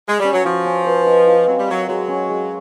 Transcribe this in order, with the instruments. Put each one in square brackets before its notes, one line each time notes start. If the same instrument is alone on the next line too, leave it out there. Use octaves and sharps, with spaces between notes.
[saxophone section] G#3
[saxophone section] G3 [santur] C#4
[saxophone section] F#3
[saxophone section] F3 [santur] F#4
[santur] C#4
B4
D#5
F4
[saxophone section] F#3 [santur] C4
[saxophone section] G3
[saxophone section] F#3 [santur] A#4
[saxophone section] F#3 [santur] G#3
[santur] C#4
G#3